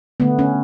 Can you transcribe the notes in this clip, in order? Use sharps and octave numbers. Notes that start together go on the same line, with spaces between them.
D3 A3 B3
C#4